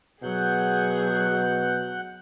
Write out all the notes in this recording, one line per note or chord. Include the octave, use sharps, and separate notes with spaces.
B2 F#3 G#4 F#5 F#6 G6